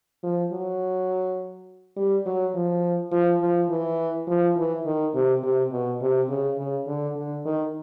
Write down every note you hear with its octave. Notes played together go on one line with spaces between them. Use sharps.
F3
F#3
G3
F#3
F3
F3
F3
E3
F3
E3
D#3
C3
C3
B2
C3
C#3
C#3
D3
D3
D#3